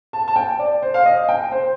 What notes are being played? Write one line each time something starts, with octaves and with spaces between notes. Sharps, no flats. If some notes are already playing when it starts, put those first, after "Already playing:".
A5
A5
G5
D5
C5
F5
D#5
G5
C5